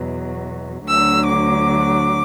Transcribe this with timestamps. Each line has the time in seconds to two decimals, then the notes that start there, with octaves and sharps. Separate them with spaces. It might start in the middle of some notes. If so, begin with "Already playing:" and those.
Already playing: E2 B2 F#3
0.87 D2 D3 F#3 E6
1.29 D6